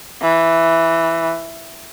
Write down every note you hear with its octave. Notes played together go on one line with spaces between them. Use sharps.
E3